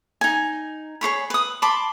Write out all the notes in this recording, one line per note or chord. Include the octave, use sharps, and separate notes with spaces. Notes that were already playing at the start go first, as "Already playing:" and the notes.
D#4 G#5
G#4 C5 C#5 B5
B4 D#6
A5 B5 C6 D6